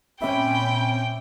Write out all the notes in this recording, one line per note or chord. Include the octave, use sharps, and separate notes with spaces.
A#2 C4 C#4 E5 G5 B5 D6